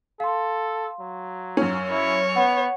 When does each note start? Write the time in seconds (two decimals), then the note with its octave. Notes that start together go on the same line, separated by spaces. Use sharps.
0.20 A4 F5 C6
1.00 F#3
1.57 F#2 C#4
1.91 E4 C#5
2.36 B3 F#5